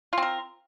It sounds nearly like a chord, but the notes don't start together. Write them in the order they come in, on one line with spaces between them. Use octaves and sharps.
F4 C4 A#4